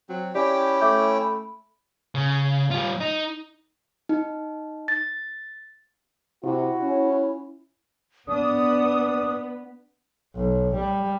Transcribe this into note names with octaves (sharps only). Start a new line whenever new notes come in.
F#3 C4
C#4 E4 G4 D5 G5
A3 E5 D6 G6
B5
C#3
G3 F4
D#4
D#4
A6
C3 E4 F#4
C#4
B3 D4 D#6
B1
G3